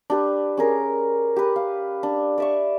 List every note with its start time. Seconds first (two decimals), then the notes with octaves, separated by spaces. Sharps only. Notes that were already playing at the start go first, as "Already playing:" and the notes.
0.10 D4 G4 B4
0.57 C#4 G#4 A#4
1.36 G4 B4
1.56 F5
2.03 D4
2.38 D5 E5 C#6